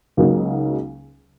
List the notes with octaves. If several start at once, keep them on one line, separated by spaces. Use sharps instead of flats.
C#2 C#3 F#3 A#3 D#4